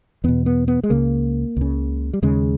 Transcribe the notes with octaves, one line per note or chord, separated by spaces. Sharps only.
E2 B2 B3
B3
B3
G#3
C#2 C#3 A#3
C#2 C#3
G3
D#2 C#3 G#3